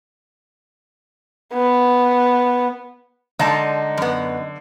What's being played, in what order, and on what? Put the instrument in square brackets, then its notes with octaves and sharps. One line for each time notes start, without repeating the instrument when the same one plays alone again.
[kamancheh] B3
[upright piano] D3 [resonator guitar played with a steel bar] G#3 D5 A5 [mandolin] D#4
[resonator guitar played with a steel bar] F#2 B3